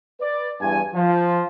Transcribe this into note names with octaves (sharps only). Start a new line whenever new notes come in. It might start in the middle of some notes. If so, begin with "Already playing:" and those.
B4 D5
E2 G2 E3 G#5
F3